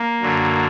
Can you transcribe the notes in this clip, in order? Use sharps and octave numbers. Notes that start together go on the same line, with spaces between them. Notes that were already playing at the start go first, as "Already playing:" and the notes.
Already playing: A#3
F#2 D3 F#3